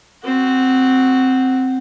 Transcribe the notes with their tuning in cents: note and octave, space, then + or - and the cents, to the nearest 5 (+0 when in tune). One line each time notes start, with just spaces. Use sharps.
C4 +0 F#4 +5